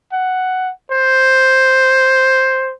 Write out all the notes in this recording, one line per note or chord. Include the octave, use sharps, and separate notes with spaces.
F#5
C5